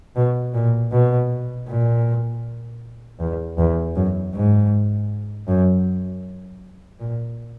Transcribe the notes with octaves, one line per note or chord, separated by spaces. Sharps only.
B2
A#2
B2
A#2
E2
E2
F#2
G#2
F#2
A#2